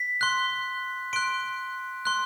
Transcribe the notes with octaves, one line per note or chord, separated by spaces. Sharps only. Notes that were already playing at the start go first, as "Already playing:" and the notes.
Already playing: B6
C6 F#6
C6 F#6 D7
C6 F#6